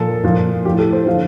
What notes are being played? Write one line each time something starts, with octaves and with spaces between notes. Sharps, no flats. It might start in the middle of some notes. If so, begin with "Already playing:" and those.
Already playing: A#2 F3 A4
A#2 F3
A2 F3 G4
A4
C5
D3 F3 F5